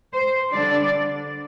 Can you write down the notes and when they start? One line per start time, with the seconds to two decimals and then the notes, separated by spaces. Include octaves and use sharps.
0.13 C5
0.52 D3 G3 D4 D5